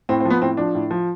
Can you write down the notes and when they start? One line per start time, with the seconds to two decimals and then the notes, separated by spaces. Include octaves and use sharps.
0.09 A2 C4
0.20 C4
0.25 F3
0.30 B3
0.42 A2 C4
0.57 F3 D4
0.75 A2
0.91 F3